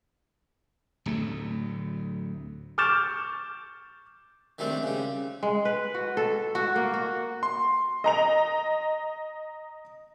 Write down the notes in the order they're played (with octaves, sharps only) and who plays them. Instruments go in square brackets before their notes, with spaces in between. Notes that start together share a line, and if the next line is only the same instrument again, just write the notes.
[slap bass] D1 D2 A3
[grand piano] C#6 D6 F6 G6 A6 E7
[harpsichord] D#3 G3 A3 C4 D4
C#3 G3
[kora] G#3
B4
F#4
A4
F#4
A#3
F#4
[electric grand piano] C6
[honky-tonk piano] D#5 A#5 F7